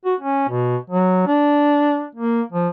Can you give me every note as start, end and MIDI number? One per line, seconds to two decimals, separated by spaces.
0.05 0.15 66
0.21 0.45 61
0.49 0.77 47
0.90 1.26 54
1.27 2.06 62
2.15 2.42 58
2.52 2.69 53